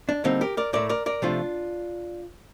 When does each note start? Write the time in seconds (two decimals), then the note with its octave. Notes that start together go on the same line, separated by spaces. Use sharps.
0.09 D4
0.24 D3 G3 A#3 C4 D#4
0.41 G4 A#4
0.57 A#4 D5
0.73 A2 A3 A#4 D5
0.89 A#4 D5
1.06 A#4 D5
1.22 C3 F3 A3 D4 F4